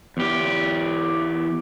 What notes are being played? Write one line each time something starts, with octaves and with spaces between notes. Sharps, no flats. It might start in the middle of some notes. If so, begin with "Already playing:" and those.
E2 G4